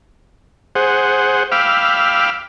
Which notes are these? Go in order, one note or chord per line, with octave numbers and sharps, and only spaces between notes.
G#4 C5 F#5
F5 G5 B5 D6 E6 F6